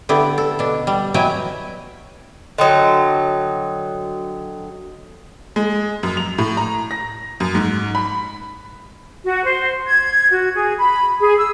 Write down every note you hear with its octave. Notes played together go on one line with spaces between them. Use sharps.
D3 B3 E4 G4
A4
B2 D4
G3
B2 F#3 E4 E5 G5 G#5
D3 F#3 D#5 G5 D#6
G#3
F#2
F7
A2
A#5
A#6
F#2
G#2
B5
F#4
C5
G#6
F#4
G#4
B5
G#4
E6